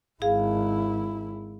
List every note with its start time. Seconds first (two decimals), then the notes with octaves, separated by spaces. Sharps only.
0.22 G#1 E4 G#4 F5